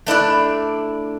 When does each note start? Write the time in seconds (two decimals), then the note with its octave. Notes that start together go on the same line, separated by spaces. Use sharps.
0.06 A3 D4 E4 D5